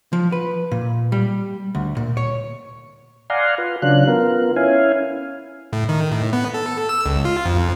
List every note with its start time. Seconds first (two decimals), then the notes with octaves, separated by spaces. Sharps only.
0.13 F3
0.32 B4
0.71 A#2
1.12 G3
1.75 D2
1.97 A#2
2.17 C#5
3.30 D5 F5 F#5 G#5 A#5 C6
3.58 F4 B4
3.82 C#3 F#3 D4 F4 F#6
4.07 B3 F4 A#4
4.56 C#4 E4 F5 G#5
5.73 A2
5.89 D#3
6.11 A2
6.33 B3
6.54 A4
6.89 E6
7.06 C#2
7.25 F4
7.46 F2